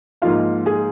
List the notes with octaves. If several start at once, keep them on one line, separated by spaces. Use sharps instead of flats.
G#2 F3 A#3 D#4 F4 F5
G#4 G#5